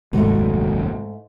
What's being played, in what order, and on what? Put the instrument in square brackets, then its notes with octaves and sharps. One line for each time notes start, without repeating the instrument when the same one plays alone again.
[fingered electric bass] F1 A#1 D#2 [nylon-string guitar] G#2 A3 [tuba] F#3